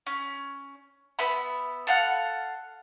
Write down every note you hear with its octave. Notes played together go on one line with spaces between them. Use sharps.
C#4
B3 E5 B5
A4 F5 F#5